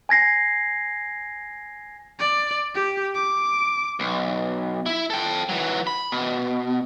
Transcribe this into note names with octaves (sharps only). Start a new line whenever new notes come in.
G#5 G#6 A#6 C7
D5
G4
D6
B1
E4
A4 G5
E3 F#3
B5
B2